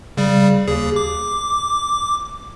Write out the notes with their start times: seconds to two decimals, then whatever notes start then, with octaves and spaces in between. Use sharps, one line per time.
0.17 C#3 G3
0.68 D#2 G#4
0.96 D6